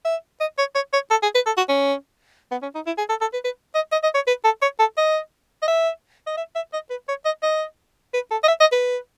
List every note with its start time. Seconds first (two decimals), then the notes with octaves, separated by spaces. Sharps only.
0.05 E5
0.40 D#5
0.58 C#5
0.75 C#5
0.93 C#5
1.11 A4
1.23 G#4
1.35 B4
1.46 A4
1.57 F#4
1.69 C#4
2.51 B3
2.62 C#4
2.75 D#4
2.87 E4
2.98 G#4
3.09 A4
3.21 A4
3.33 B4
3.44 B4
3.75 D#5
3.92 D#5
4.03 D#5
4.15 C#5
4.27 B4
4.44 A4
4.62 C#5
4.79 A4
4.97 D#5
5.63 D#5
5.68 E5
6.27 D#5
6.37 E5
6.55 E5
6.73 D#5
6.90 B4
7.08 C#5
7.25 D#5
7.43 D#5
8.14 B4
8.31 A4
8.43 D#5
8.48 E5
8.60 D#5
8.72 B4